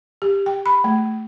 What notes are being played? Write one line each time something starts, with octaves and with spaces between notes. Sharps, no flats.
G4
G5
B5
A3